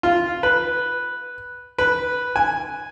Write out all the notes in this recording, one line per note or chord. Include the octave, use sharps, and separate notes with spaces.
F4
B4
B4
G#5